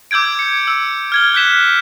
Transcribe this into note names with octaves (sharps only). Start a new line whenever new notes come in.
D6 E6 G6 G#6 D7
G#6 C#7
E6
F6 G#6 G7
F#6 G6 B6 E7